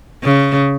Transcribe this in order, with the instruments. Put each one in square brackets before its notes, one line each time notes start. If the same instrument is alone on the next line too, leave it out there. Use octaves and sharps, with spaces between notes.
[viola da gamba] C#3